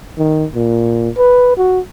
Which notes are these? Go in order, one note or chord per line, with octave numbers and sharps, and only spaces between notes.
D#3
A#2
B4
F#4